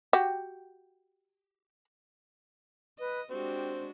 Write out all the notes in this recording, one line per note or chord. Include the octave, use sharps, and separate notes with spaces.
F#4 G4
B4 D#5
G#3 C4 D4 F#4 G4